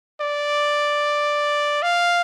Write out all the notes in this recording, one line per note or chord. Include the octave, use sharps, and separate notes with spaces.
D5
F5